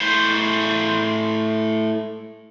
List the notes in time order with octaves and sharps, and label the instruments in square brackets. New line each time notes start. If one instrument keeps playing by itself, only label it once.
[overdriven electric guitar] A2 C5